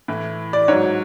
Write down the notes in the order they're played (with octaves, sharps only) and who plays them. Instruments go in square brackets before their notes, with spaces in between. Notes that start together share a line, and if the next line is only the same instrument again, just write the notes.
[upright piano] A2 E3
D5
G#2 C#5
F#3